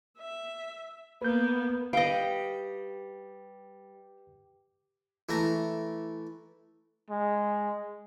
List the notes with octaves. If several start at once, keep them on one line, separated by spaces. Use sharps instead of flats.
E5
A#3 B3 B4 G6
G3 B4 D#5 F5 G5
E3 A3 A#5
G#3